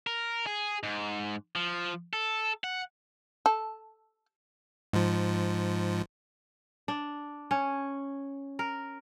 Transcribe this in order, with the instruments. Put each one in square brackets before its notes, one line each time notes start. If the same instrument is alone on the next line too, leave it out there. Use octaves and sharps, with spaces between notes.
[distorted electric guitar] A#4
G#4
G#2
F3
A4
F#5
[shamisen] A4
[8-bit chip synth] G#2 F3
[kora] D4
C#4
A#4